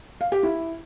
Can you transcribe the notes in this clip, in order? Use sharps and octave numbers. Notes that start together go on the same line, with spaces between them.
F5
G4
E4